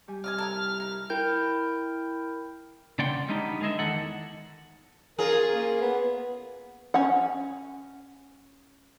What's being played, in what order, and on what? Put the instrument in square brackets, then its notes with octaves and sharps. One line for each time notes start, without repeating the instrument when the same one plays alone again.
[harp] G3 G4 G#5
[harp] C3 E6 [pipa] D5 D#5 G#5 [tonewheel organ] F6
[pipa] A4 A#4 G#5
[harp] E4
[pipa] D#4 A#4 [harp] E4 [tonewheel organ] F6
[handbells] E4 A#4 G5 G6
[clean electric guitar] C#3 A#3 D5 F#5 G5 C6
G3 G#3 B3 D4 D#4
D3 G#3 G#4 D#5 E5
E2 D#3 A4 F#5
[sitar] C#4 F4 G#4 [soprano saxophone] A#4
[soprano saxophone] A#3
B3
[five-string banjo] C#4 F#5